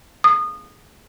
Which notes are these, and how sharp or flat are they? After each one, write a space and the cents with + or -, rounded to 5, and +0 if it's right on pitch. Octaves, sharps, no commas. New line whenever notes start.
D#6 -25